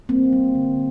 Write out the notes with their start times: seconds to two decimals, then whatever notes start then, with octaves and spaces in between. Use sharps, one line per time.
0.09 G3 A#3 C4
0.33 G3
0.55 D3